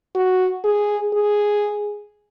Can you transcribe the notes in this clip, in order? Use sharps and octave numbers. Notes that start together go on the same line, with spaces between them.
F#4
G#4
G#4